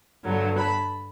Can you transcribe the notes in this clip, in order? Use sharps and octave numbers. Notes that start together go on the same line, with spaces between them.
G2 D3 F#3 B3
A5 B5